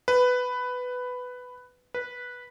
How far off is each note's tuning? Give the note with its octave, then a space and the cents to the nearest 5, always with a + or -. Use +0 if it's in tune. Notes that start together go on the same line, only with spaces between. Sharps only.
B4 +10
B4 -10